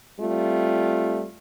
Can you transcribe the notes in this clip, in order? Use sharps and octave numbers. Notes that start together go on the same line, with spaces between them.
G3 A3 C4 F4